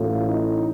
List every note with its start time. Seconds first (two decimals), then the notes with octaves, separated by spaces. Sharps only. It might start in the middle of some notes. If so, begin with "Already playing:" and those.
Already playing: A1 A2 F4
0.29 D#4